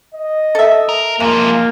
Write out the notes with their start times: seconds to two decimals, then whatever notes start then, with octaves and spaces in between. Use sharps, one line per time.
0.14 D#5
0.55 A4 E5
0.89 A#4
1.20 E2 F3 G#3 A#3